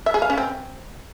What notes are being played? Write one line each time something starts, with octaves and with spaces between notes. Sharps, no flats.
E5
G#4
F5
C#4
C4